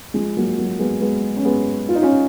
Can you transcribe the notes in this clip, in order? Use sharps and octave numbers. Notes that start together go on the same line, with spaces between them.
F3 G#3
F#3 A#3
F#3 A#3
G#3 B3
G#3 B3
C#4
G#3 B3
F4
D#4
C#4 F4